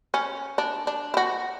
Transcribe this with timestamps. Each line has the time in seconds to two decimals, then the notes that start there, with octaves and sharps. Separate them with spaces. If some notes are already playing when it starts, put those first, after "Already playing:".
0.14 C#4
0.58 D4
0.87 D4
1.14 E4
1.17 F#4